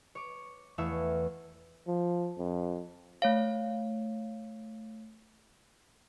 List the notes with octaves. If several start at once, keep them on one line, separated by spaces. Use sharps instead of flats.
C#5 D6
E2 A3 C#5 E5 F5 E6
F3
F2
A3 C#5 F5